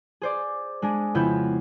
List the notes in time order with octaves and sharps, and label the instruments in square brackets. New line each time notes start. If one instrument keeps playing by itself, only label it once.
[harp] G#4 C5 D5
G#3 D4 G#4
F2 C#3 B3 E4 E5 G6